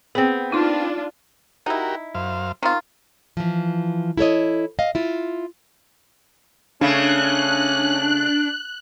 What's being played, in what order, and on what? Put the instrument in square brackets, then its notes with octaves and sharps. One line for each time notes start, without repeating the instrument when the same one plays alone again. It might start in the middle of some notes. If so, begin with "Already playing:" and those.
[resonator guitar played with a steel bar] B3 C4 [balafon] G#4 G5
[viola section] D4 F4 [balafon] D#4 C6
[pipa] D#4 E4 [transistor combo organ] F#4 G4 A#4
[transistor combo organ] F#2 C5 F5
[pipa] D#3 F4 [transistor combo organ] C4
[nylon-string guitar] E3 F3
E4 A4 C#5 D#5
D#5 F5
E4 F4
[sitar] C#3 A3 [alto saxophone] C#4 [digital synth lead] D4 [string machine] F#6